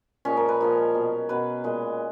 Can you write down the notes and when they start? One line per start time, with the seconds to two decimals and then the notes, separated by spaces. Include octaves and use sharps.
0.25 A#2 F3 G#3 C#4
0.37 A#4
0.49 B4
0.61 A#2 F3 G#3 A#4
0.95 B2 F#3
1.29 B2 F#3 B4
1.64 A#2 G#3